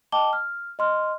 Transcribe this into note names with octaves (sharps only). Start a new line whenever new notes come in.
D#5 G5 A5 D6 G7
F6
D#5 C6 F6